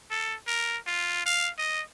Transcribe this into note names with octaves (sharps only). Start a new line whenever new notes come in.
A4
A#4
F4
F5
D#5